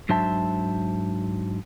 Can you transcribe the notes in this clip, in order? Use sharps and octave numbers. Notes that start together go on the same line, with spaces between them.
G#2 F#3 D4 C5 E5 A5